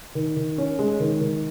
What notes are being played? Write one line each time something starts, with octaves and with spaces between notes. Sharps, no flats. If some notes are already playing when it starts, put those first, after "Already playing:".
D#3
D#3
C#4
G#3
D#3
D#3